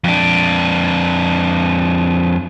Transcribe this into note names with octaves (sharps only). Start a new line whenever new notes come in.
F2 D4